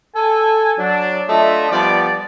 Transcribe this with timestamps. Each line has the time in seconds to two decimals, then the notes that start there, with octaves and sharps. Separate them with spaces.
0.15 A4 G#5
0.78 F#3 D4
1.28 A3 D4 F4 D#5 E5
1.70 F3 G3 B3 D5